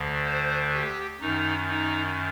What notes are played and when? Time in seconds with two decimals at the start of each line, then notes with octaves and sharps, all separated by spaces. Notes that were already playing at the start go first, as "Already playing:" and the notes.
Already playing: D2 D3
0.25 C5
0.73 G4
1.21 F#2 D#3 D#4
1.69 D#4